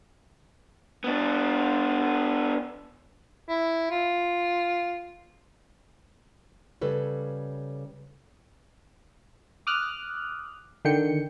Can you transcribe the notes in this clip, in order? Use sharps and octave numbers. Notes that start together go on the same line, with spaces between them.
B3 D4
E4
F4
C#3 G3 A4 B4 C#5
D6 D#6 F6 F#6
D3 D#3 G5 C#7